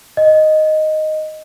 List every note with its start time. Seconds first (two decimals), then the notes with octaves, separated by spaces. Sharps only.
0.17 D#5